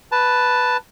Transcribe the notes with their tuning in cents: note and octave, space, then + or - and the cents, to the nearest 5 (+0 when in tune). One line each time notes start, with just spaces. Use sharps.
B4 +0 A5 +0